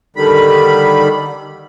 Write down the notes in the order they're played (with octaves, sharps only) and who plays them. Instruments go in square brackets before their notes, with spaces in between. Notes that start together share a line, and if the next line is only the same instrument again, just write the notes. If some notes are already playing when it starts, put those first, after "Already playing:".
[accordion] D3 D#3 G3 B5